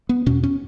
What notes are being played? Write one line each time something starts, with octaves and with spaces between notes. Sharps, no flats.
B3
E2 B2 C#4
C#4